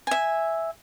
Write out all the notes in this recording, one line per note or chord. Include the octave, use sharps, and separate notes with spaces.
E5 G#5